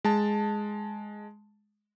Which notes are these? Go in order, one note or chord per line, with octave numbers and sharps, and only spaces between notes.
G#3 A5